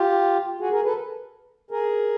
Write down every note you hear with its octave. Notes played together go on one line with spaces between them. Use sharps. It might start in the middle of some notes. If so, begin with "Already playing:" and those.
Already playing: F4 G4
F#4 G#4
G#4 A#4
A4 B4
G#4 A#4